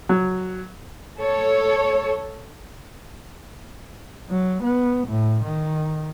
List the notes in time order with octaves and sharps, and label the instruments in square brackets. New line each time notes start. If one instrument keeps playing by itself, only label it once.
[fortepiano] F#3
[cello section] A4 C#5
[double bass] F#3
B3
A2
D#3